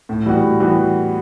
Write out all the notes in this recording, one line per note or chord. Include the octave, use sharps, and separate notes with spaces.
A2
E3 G3 B3 F#4
A2
E3 G3 B3 F#4